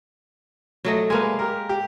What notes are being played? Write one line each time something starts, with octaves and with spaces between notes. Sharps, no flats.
F#3 A3 D#5
G#3 A#3 B4 F5 G#5
G4 A#4
G4